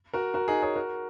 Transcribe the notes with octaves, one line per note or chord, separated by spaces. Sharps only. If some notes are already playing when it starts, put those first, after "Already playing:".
F#4 A#4
F#4 A#4
D#4 G#4
G#4 C#5
F#4 A#4